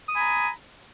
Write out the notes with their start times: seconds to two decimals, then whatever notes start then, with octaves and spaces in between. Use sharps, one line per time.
0.08 D#6
0.12 G#5
0.16 B5
0.20 A#5